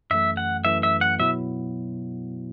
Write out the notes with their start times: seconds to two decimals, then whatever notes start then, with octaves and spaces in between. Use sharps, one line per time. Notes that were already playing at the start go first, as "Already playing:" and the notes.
0.11 F#2 E3 A3 E5
0.37 F#5
0.64 F#2 E3 A3 E5
0.83 E5
1.01 F#5
1.19 B2 F#3 B3 E4 E5